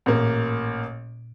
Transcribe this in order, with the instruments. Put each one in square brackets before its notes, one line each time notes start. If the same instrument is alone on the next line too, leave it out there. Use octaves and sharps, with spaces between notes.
[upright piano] A1 A#3 [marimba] A#2